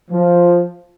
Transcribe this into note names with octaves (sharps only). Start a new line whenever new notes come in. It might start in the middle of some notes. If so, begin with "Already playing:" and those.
F3